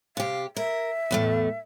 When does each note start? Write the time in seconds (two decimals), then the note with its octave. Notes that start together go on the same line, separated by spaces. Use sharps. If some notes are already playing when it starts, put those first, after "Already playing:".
0.17 C3 G4 F5
0.56 A#4 E5
1.11 E2 A2 A3